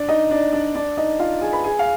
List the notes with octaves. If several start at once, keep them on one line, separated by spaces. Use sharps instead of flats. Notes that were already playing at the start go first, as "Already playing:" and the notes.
Already playing: D4 D5
D#4 D#5
D4 D5
D4 D5
D4 D5
D#4 D#5
F4 F5
G#4 G#5
B4 B5
G#4 G#5
F5